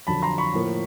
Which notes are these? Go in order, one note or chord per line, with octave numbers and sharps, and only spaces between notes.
F2 D3 F#3 A5 B5
A#5 C6
B5 C#6
A2 F3 A#3